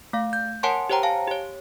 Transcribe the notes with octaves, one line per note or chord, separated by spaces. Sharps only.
A3 F5
G6
A#4 C#5 F#5 G#5 A5 C6
G4 C5 C#5 G5 A#5
F5 G#5 A5
G4 C#5